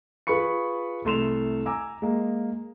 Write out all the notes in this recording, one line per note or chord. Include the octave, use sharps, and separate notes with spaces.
F4 G#4 B4 B5 C#6 C#7
C2 A3 C6 E7 F7
G#5 A#5 D6 E6
G#3 A#3